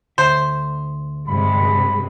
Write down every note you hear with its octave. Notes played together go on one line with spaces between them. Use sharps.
D2 D3 C5 E5
G2 C3 G#3 B5